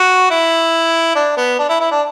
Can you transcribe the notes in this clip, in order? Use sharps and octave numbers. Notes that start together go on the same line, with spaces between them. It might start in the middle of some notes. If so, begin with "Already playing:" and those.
Already playing: F#4
E4
D4
B3
D4
E4
E4
D4